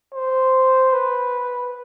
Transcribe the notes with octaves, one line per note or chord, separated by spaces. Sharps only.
C5
B4